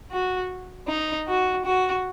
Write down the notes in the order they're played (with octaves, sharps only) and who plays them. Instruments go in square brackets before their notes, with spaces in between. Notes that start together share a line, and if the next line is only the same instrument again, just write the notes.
[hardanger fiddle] F#4
D#4
F#4
F#4